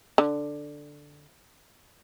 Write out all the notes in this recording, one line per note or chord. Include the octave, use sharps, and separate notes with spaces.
D3